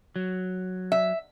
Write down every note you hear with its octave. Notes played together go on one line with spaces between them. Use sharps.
F#3
E5